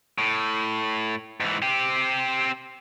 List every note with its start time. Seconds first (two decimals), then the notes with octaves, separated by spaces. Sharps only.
0.18 A2
1.40 G#2 E3
1.62 C4 G4